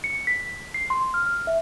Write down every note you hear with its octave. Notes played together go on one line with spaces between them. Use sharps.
C#7
B6
C7
C6
F6
F6
E5